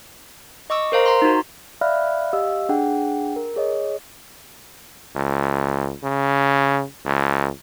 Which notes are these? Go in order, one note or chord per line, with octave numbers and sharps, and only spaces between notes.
D#5 C#6 D6 E6
A#4 C5 F5 A#5
A#5 C6
D#4 F#4
D5 E5 F5 B5 F6 F#6
G4 D#5 F5 E6
D4 G#4 F#5 G5
A#4
G#4 C#5 D#5
C#2
C#3
C#2